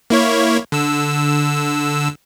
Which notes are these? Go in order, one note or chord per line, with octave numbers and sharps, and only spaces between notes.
A#3 E4 C#5
D3 E6